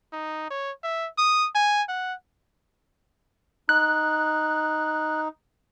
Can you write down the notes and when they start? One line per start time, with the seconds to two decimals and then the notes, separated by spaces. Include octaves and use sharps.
0.13 D#4
0.51 C#5
0.84 E5
1.18 D#6
1.55 G#5
1.89 F#5
3.69 D#4 F#6